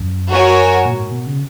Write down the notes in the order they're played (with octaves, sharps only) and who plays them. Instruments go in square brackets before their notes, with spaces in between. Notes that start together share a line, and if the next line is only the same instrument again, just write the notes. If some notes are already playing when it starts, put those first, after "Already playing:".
Already playing: [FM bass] F#2
[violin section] F#4 A#4 C#5 G#5
[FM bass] A#2
G#2
B2
C#3